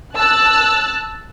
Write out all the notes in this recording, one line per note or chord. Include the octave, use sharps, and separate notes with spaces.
A5 E6 F#6 A6